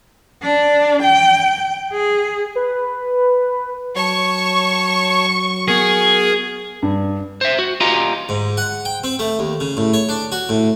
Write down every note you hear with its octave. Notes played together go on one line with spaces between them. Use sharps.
D4
G5
G#4
B4
F#3 C#5 A5 C#6
B3 G#4 A#4
G2
C5 E5
F#4
F4 G4 D#5 F5 G#5 A#5
G#2
F#5
G5
C4
A3
D#2
C#3
A2
C#5
D4
F#4
A2